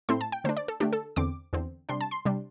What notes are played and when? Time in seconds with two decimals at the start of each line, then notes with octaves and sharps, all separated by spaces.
0.09 A2 A3 C4 E4 C6
0.21 A5
0.32 G5
0.44 D3 A3 D4 C5
0.57 D5
0.68 A4
0.80 D3 A3 D4 G4
0.93 A4
1.16 E2 D3 C4 D6
1.53 E2 D3 C4
1.89 C3 G3 D4 C6
2.01 A5
2.11 C6
2.25 C3 G3 D4